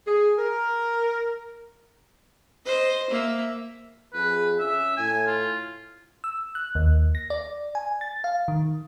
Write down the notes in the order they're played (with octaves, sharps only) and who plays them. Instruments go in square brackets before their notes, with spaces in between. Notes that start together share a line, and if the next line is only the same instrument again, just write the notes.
[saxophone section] G#4
A#4
[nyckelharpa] C5 D#5
A#3 E5
[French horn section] F2 G#4 [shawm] B4
[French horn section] C#4 [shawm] E5
[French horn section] A2 [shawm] G#5
[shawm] F4
[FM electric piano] E6
F#6
D#2
A#6
D5
G#5
A6
F5
D#3